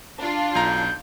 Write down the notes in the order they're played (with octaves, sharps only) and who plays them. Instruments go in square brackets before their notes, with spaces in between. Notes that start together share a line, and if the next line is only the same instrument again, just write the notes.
[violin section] D4 F4
[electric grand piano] B1 A#5 [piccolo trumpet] G6